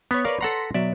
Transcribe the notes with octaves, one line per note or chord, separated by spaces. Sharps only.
B3 C#5 B5
A#4 B4 C#5 D5 F5
A4 F#5 A#5 C6 A#6 B6
B2 F#3 D5 E5